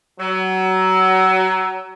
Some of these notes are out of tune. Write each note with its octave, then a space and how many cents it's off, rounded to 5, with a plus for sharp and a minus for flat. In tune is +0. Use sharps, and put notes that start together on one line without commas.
F#3 +25